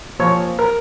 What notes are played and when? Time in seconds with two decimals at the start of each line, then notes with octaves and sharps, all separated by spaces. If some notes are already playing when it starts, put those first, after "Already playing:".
0.19 A#2 F3 C#5
0.59 A#4